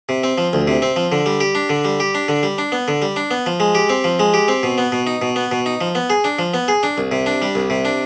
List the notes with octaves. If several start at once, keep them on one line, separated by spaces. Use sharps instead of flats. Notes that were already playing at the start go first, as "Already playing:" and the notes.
C3
C4
F3
D2
C3
C4
F3
D3
G3
G4
D4
D3
G3
G4
D4
D3
G3
D4
B3
D3
G3
D4
B3
F3
G#3
G4
C4
F3
G#3
G4
C4
B2
B3
B2
D#4
B2
B3
B2
D#4
F3
B3
G#4
D4
F3
B3
G#4
D4
C2
C3
D4
G3
C2
C3
D4